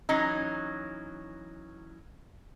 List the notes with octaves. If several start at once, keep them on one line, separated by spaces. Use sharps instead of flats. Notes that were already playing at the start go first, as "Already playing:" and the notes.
E3 F#3 C#4 D#4